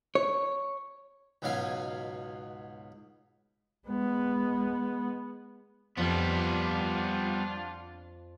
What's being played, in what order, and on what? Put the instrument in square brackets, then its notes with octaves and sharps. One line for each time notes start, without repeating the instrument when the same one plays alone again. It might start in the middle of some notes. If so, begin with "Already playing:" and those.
[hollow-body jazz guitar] C#5
[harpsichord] C#2 G#2 B2 F#3 F5 G#5
[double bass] G#3 B3
[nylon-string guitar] F2 F3 [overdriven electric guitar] G3 B3 [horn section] D4 F4